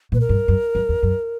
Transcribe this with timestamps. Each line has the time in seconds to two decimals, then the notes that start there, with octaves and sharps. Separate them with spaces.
0.12 A#2 B4
0.20 A#4
0.29 G2
0.48 F#2
0.75 F#2
0.89 E2
1.03 F#2